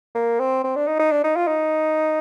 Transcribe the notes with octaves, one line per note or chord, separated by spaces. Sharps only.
A#3
C4
C4
D4
D#4
D#4
D4
D#4
F4
D#4